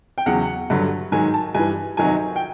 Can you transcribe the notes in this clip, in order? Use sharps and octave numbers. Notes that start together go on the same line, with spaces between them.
G5
E2 C#3 F#3 F#5
G2 D3 F#3
G#2 D#3 F#3 G#5
A5
G2 E3 G#5
F2 C3 D#3 F#3 G#5
G5